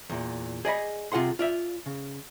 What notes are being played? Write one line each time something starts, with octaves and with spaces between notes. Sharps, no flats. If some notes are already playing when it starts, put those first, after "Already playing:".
E2 A#2
G#4 D5 D#5 B5
C3 F4 G#4 F#5 C6
F4 D5 E5
C#3